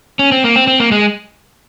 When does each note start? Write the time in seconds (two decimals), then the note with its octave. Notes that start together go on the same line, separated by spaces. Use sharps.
0.19 C#4
0.32 C4
0.44 A#3
0.56 C4
0.68 C4
0.80 A#3
0.92 G#3